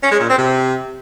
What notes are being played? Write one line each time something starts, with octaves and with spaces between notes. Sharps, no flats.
C#4
G#3
A#2
C4
C3